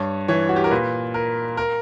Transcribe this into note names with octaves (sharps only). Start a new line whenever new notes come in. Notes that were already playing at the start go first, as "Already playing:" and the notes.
Already playing: G2 C#5
E3 C#5
F#4
G4
A#4
A#2 B4
A#4
A#4